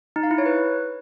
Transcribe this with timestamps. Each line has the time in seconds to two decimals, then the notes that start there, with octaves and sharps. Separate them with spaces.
0.16 D#4
0.23 F5
0.31 E4
0.38 C#5
0.46 B4